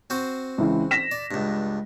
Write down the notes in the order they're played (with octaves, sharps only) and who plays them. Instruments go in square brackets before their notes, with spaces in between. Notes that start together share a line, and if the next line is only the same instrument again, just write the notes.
[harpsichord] C4 F#4 C5
[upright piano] C#2 E3
A#6 B6 E7
[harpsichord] D5
C#2 G2